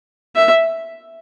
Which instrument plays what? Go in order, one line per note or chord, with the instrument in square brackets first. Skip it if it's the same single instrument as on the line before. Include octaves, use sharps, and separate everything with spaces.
[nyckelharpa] E5